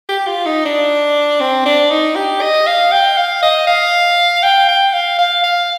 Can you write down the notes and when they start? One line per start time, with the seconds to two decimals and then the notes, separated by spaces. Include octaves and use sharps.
0.09 G4
0.27 F4
0.46 D#4
0.65 D4
1.40 C4
1.66 D4
1.91 D#4
2.16 G4
2.41 D#5
2.67 F5
2.92 G5
3.17 F5
3.42 D#5
3.67 F5
4.43 G5
4.68 G5
4.93 F5
5.18 F5
5.44 F5